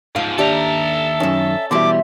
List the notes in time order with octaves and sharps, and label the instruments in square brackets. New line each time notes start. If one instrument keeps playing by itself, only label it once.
[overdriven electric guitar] G#2 F3 [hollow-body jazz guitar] F5
[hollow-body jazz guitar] D#2 G4 [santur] D4 [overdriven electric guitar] A4 A#5 [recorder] E5
[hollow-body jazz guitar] F#2 D#3 [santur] C#4
[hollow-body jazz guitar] B2 E3 G3 [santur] E5 C6 [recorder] D6